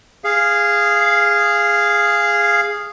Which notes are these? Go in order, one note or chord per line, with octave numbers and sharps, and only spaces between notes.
G#4 F5